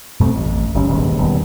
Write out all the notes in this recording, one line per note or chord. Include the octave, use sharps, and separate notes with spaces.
F#2 B2 A3 C4
A1
G1 G2 C4 C#4
D#1 D#2 G#2 B2
E1 D#3 G3 B3